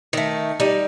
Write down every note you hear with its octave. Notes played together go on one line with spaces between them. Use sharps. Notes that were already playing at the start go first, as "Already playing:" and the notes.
D#3 A3
G3 D#4